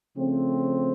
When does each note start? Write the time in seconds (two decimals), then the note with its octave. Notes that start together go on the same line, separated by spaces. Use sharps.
0.16 C#3 F3 A3 C4